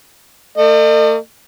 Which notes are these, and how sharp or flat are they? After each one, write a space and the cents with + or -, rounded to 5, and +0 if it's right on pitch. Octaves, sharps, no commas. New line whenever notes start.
A3 +45 D#5 -40